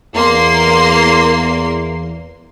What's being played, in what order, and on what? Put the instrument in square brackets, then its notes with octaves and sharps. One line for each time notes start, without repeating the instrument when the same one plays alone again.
[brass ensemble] E2 [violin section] A#3 C6